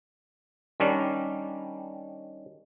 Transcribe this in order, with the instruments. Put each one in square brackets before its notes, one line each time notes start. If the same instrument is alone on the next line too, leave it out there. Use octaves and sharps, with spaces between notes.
[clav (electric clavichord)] D#3 G3 C#4 D4